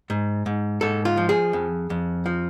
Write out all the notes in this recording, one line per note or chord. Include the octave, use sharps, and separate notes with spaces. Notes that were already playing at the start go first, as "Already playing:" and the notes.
G#2
G#2
G#2 A4
F4
F3
G#4
F2
F2
F3